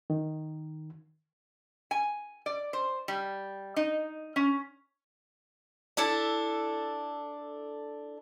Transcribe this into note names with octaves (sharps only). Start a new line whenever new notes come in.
D#3
G#5
D5
C5
G3
D#4
C#4
D4 E4 A4